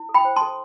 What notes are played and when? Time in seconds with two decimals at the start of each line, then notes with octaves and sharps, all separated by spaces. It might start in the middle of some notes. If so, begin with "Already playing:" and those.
Already playing: E4
0.09 A4
0.14 G5 B5
0.25 C5
0.36 A5 C6
0.42 A4